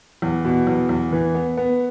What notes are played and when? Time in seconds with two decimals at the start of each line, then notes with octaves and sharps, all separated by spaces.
0.22 E2
0.45 B2
0.67 E2
0.89 E2
1.12 E3
1.35 B3
1.57 B3